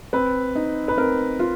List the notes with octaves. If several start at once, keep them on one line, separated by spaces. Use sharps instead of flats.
C4 B4
D#4
B4
C4 A#4
F4